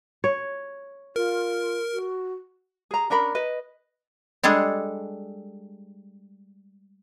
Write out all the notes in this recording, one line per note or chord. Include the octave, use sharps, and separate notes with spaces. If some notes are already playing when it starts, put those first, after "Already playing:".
C#5
F4 A#4
F#4
G#4 A#5
C#4 D4 A#4 B5
B4 D#5
G3 G#3 D4 G#4 A4